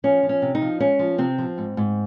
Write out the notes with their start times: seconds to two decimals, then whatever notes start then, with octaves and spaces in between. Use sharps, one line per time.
0.04 F3 C#4
0.23 F3
0.29 C#4
0.42 C3
0.55 D#4
0.62 F3
0.80 G#3 C#4
0.99 F3
1.18 C3 C4
1.38 F3
1.58 G#2
1.77 G#2